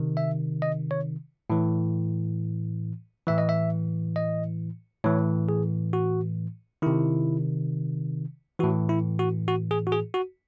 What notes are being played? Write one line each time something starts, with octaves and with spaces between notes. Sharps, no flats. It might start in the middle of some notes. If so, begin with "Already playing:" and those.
Already playing: C3 D#3
E5
D#5
C#5
A2 E3
A2 E3 E5
D#5
E5
D#5
A2 E3 C#5
G#4
F#4
C3 D#3 E4
A2 E3 F#4
E4
F#4
F#4
G#4
F#4
G#4
F#4